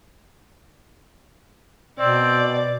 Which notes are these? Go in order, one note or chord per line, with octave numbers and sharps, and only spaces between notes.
B2 C4 D5